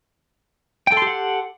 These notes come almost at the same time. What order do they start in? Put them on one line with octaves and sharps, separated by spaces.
G5 A4 C6 G4 F#5